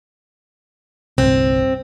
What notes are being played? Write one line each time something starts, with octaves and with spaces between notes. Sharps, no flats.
G1 C2 C4